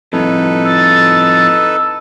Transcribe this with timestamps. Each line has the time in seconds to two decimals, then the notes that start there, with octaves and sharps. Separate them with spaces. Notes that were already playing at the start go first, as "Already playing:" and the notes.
0.13 F2 A2 D#4 A4 B4
0.66 E6 A6